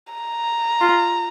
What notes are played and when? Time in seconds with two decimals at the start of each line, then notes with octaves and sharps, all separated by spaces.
0.13 A#5
0.81 F4